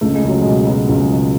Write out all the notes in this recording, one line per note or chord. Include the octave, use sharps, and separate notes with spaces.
C#2 A3
G#3
C#2 F#3
B2 G#3
F#3 B3
C#2
G#3
C#2